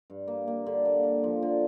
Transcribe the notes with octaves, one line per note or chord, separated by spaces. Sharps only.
G2
A#3
A#3
D3
A#3
A#3
F3
D3